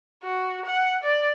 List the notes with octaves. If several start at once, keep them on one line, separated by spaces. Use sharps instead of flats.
F#4
F#5
D5